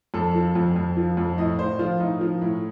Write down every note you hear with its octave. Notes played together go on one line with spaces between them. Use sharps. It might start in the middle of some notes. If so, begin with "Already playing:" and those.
F2 A4
F3
F2
F2
F3
F2
A2 D#5
A2 C5
F3 F4
A2 D#4
F3
A2